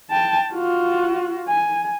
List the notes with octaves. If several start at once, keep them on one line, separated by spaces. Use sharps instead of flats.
G5 A5
F4 F#4
G#5